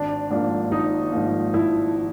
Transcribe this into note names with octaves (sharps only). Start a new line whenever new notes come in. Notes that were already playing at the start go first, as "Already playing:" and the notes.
Already playing: G#1 D4
G#2 F3 A#3 D4
G#1 D#4
G#2 F3 A#3
G#1 E4
F3